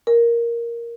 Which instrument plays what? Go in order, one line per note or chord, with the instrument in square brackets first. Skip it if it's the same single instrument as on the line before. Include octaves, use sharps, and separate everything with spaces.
[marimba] A#4